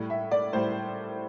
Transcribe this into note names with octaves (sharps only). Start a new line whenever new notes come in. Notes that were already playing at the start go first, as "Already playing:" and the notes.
Already playing: A2 G3
E5
D5
A2 G3 C5